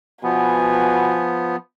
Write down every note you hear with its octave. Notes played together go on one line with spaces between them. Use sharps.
B2 F3 B3 G#5